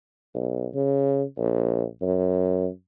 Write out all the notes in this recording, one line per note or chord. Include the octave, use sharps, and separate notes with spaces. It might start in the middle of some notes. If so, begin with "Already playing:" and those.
B1
C#3
A#1
F#2